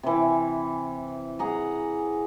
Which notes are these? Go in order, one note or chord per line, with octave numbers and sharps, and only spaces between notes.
C3 E3
G#4 F#5 A#5